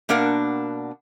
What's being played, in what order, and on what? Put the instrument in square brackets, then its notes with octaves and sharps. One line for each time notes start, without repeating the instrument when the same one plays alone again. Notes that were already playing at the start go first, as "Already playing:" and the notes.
[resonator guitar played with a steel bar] B2 A#3 D4 A#4 F#5